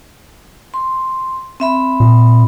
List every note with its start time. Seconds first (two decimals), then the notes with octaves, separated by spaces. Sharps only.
0.74 C6
1.60 C4 E5 B5
2.00 A#2